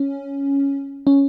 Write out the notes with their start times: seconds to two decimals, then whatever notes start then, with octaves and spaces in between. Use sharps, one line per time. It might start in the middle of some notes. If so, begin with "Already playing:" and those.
Already playing: C#4
1.07 C#4